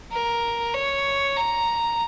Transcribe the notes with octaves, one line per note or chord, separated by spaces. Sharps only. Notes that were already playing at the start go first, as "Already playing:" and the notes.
A#4
C#5
A#5